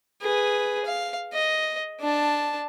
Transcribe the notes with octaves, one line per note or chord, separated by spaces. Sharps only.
G#4 B4
F5
D#5
D4 A5